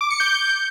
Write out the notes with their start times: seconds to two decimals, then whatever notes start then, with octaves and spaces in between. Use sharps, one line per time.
0.01 D6
0.10 C#7
0.20 G6